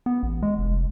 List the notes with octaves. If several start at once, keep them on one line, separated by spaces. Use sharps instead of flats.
B3
A1
G#3
F1